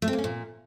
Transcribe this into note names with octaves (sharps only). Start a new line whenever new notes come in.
A3
C4
A#3
C#4
A#2